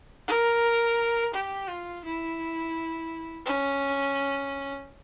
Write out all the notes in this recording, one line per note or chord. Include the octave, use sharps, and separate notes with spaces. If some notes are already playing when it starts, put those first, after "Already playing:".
A#4
G4
F4
E4
C#4